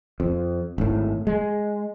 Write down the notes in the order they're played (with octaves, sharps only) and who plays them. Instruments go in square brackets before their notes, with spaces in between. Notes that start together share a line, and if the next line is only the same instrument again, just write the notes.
[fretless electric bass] F2
G#1 A2
G#3